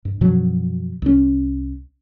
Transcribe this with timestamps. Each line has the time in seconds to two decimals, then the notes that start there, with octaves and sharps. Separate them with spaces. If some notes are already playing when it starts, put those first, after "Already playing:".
0.05 G2
0.21 F#2 B2 F3 F#3
1.02 C2 C#4